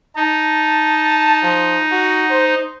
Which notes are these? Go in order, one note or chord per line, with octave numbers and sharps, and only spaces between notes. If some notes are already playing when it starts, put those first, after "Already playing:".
D#4 A5
F3
F#4
C5